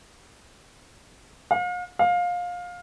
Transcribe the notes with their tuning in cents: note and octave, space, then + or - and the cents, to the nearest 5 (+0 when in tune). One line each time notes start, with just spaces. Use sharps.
F5 +40
F5 +20